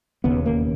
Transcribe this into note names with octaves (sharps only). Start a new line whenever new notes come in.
E1 D#2 C#3 B3
A#3